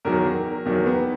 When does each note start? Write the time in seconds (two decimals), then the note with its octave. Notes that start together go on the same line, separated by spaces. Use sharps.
0.05 E2 D#3 F#3 A#4
0.65 E2 D#3 F#3
0.86 B3